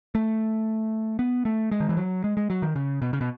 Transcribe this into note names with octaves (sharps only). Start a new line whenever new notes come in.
A3
B3
A3
G#3
D#3
E3
F#3
G#3
G#3
F#3
D#3
C#3
B2
C#3
B2